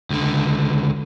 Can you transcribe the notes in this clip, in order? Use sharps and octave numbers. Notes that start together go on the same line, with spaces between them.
C#2 D3